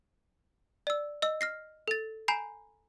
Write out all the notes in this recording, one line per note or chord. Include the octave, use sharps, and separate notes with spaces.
D5 E6
D#5 E6
F6 A#6 C7
A4 A6
G#5 A#5 B5 G6 C7